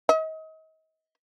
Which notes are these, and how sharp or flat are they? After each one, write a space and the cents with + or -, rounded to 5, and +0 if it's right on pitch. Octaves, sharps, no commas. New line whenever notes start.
D#5 +35